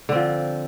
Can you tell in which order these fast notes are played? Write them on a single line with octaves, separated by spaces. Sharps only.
D3 C4 F3